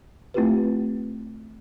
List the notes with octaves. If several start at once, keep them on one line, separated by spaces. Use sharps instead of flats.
A3 C4 E4 F4 G4 B4